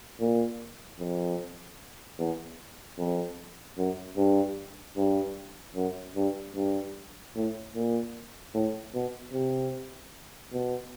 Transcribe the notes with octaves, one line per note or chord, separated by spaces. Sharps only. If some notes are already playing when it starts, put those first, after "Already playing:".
A#2
F2
E2
F2
F#2
G2
G2
F#2
G2
G2
A2
A#2
A2
B2
C3
B2